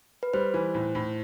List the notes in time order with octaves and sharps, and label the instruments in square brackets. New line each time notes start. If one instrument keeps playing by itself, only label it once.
[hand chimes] B4
[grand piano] G3 [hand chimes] C5
[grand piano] E3
A2
A2